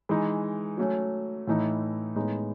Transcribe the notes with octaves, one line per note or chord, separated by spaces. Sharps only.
E3 G#3 D#4
F#3 A3 C#4
A2 E3 A3 D#4
A2 G#3 B3 D#4